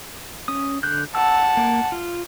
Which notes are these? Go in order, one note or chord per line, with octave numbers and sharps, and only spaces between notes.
C#4 D#6
D3 F#6 G6
F#5 A5 E6
A#3
F4